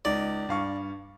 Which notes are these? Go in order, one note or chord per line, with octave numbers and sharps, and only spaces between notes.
C#2 D#4 D5
G2 F5 C#6